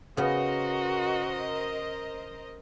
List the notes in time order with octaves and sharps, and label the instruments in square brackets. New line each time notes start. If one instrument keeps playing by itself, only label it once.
[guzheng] C#3 B3 [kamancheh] F#4 [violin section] A#4 C5 D#5